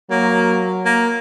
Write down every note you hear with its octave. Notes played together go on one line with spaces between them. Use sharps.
F#3 A#3
A#3